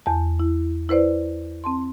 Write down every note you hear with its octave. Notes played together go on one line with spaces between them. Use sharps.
E2 A5
E4
E4 B4 C5 D5
C4 A5 C6